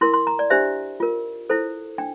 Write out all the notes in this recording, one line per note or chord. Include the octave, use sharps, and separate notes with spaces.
E4 A#4 C6
C6
A#5
D5
D4 G4 C5 E5
F4 A#4
E4 A4 C5
D4 G5